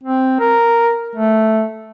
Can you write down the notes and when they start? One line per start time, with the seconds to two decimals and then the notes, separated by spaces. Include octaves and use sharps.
0.03 C4
0.40 A#4
1.16 A3